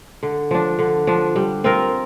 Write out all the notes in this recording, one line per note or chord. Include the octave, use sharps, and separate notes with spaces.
D3
F3 D4
D3
F3 D4
G3
C4 F4 A#4